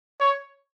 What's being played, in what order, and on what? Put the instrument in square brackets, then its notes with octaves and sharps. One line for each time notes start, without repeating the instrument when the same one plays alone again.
[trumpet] C#5